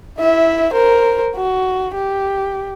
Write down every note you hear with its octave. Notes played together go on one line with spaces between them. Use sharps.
E4 E5
A#4 C5
F#4
G4